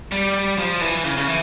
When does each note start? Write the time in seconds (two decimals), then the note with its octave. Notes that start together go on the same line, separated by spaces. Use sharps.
0.12 G3
0.58 F3
0.81 E3
1.04 C#3
1.17 C#3
1.27 E3